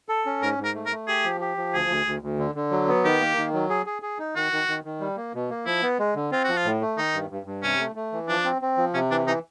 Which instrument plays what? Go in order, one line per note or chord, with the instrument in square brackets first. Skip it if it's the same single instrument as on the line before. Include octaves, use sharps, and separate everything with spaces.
[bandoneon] A4
C#4
[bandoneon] G#2 [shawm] A#4
[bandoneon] G#2
[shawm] A#4
[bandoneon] A3
[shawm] A#4
[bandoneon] A3
[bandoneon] G4 [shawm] G#4
[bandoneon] F3
G4
F3
[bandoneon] D2 [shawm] G#4
[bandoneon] D2
D2
D2
D3
D3
F#3
B3
[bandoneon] D#3 [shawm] G4
[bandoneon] A#3
D#3
F#3
G#4
G#4
G#4
D#4
[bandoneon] D#3 [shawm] F#4
[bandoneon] D#3
D#3
D#3
G3
A#3
B2
A#3
[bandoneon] F3 [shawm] E4
[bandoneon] B3
G#3
D3
[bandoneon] C4 [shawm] F4
[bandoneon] F3 [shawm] F#4
[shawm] F4
[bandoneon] A2
A3
[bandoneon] D#3 [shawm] D#4
[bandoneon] G2
G2
G2
[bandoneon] C3 [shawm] C#4
[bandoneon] A3
A3
E3
[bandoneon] F3 [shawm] D4
[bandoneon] C4
C4
F3
[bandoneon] C3 [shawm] C#4
[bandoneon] E3 [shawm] D4
[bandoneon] E3 [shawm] D#4